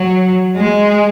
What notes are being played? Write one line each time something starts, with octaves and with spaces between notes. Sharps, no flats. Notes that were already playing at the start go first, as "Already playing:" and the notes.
Already playing: F#3
G#3